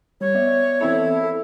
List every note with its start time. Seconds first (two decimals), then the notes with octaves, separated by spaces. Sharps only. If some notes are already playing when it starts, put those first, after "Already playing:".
0.21 G3 C#5
0.35 B3 D5 E5
0.81 E3 C4 E4 A4
1.23 A4